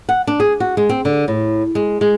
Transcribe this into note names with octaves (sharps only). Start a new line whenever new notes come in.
F#5
D4
G#4
F#4
G#3
C4
D3
A2
G#3
G#3